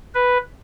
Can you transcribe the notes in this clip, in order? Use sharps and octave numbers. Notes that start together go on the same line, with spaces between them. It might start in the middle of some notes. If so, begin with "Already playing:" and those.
B4